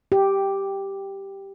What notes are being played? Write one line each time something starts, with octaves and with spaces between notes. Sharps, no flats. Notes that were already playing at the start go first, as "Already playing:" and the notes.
G4